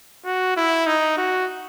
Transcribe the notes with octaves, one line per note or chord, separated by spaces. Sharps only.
F#4
E4
D#4
F#4